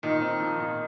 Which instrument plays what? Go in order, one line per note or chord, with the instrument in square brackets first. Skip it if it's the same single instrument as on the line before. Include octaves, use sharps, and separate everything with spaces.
[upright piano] A#2 [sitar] D#3
[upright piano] C4
F3
A#2